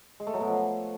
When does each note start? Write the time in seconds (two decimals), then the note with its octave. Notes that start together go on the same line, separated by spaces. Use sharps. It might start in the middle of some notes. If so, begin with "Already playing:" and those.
0.20 G#3
0.27 A3
0.34 F#3
0.41 B2
0.48 F3